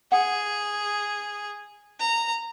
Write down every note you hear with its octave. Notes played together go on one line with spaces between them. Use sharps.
G#4 F#5
A#5